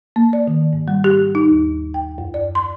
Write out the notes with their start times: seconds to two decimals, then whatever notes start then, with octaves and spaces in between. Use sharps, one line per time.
0.16 A#3
0.33 D5
0.47 D#3
0.73 G#2
0.88 G3
1.04 G4
1.35 D#4
1.50 D#2
1.94 G5
2.18 F#2
2.34 D5
2.55 C6